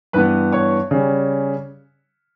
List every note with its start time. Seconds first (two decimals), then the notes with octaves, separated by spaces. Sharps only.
0.13 G2 E3 B3 B4 B5
0.52 C#5 C#6
0.91 C#3 G3 C#4